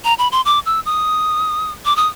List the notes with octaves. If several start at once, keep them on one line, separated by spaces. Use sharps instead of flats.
A#5
B5
C6
D6
E6
D#6
D6
D#6